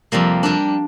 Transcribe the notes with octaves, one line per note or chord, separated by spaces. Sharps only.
F2 C3 G3 A#3
G3 A#3 D4